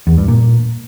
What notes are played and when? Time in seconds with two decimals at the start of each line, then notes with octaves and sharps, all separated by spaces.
0.07 E2
0.17 G2
0.28 A#2